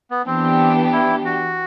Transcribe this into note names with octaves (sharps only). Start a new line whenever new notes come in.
B3
E3 B3 C4 D4 G4
E4
F#4